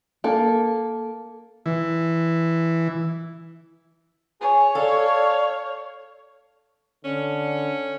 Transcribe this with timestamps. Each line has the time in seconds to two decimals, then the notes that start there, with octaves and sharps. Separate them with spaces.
0.24 A#3 A4
1.66 E3
4.41 G#4 C#5 G#5
4.75 A4 D5 F5
7.05 D3 C#4